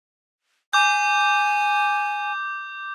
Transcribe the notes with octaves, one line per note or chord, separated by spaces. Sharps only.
G#5 D6 G6